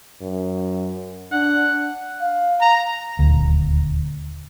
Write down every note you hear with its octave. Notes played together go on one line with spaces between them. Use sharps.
F#2
D4 F#5
F5
A#5
D#1 D2